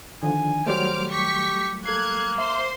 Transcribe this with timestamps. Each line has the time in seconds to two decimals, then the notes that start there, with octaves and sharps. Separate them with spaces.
0.23 D3 D#3 F3 D4 G#5
0.67 F#3 G3 A3 C5 D6 F6
1.10 G4 C#6 B6
1.86 A#3 A4 F#6 G#6 C7
2.38 C5 E5 C6